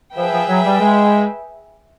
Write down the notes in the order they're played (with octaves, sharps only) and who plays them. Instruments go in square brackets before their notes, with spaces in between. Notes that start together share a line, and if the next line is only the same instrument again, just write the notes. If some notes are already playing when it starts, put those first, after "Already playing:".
[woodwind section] F3 [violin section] G#4 B4 E5 G5
[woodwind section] F3
F#3
G3
G#3